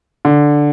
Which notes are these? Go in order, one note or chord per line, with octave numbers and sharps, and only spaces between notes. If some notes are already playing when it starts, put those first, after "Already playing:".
D3